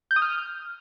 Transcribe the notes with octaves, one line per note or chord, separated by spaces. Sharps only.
G6
D#6
F6